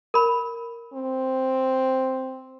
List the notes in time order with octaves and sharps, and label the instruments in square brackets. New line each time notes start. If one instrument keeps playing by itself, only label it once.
[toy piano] A#4 B5
[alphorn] C4